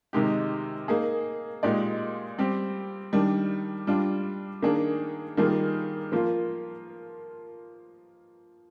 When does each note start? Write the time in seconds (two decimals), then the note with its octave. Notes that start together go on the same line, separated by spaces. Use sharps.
0.13 C3 D#3 G#3 D#4 G4
0.88 A#3 D#4 G#4
1.63 A#2 G#3 D#4 G4 D5
2.38 G3 C4 G4
3.13 D#3 G3 D4
3.87 G3 D4 F4
4.62 D#3 A#3 D4 G#4
5.37 D#3 G3 A#3 F4 G#4
6.12 F3 A#3 F4